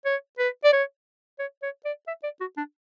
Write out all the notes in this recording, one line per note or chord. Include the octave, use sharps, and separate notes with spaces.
C#5
B4
D5
C#5
C#5
C#5
D5
E5
D5
F#4
D4